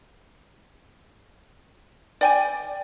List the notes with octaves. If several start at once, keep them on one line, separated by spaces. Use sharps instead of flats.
D5 G5 G#5